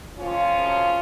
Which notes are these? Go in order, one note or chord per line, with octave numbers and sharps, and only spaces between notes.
F2 F3 C#4 F4
F#2 C#3 F3